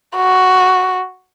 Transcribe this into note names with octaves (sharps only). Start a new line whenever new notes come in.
F#4